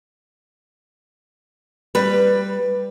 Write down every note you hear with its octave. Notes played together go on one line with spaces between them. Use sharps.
G3 B4